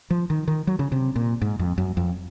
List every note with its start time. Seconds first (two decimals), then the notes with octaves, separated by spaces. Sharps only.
0.10 F3
0.30 D#3
0.48 D#3
0.67 F#3
0.79 C#3
0.92 C3
1.16 A#2
1.42 G#2
1.59 F2
1.78 F#2
1.97 F2